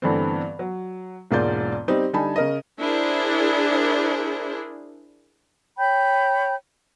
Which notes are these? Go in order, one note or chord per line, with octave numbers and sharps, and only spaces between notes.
G2 D3 E3 A3 B3 C4
F#3
E1 G#2 A#3 F4 D5 G6
G3 C4 D#4 G4
D3 G3 D#4 G#5 A5 B5
C#3 A#4 D#5
D4 E4 G#4 A#4 C5
C#5 G5 B5 G6